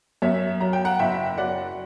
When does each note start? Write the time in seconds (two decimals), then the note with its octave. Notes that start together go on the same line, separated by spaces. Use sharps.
0.22 F#2 C#5 E5
0.60 F#3 A#5
0.73 G5
0.85 F#5 A#5
0.99 F#1 E5 G5
1.38 F#3 D5 F#5